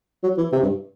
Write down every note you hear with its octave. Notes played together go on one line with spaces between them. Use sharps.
F#3
E3
C3
G2